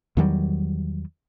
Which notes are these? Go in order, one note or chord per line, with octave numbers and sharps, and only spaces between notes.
E2 D#3 F#3 G3